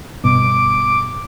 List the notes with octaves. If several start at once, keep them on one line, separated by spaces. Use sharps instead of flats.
G1 B2 D6